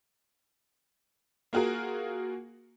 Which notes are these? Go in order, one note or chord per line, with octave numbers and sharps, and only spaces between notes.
A#3 F4 F#4 G#4 A#4